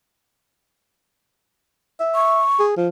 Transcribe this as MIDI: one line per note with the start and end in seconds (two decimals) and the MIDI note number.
2.00 2.42 76
2.15 2.63 85
2.60 2.74 68
2.77 2.88 53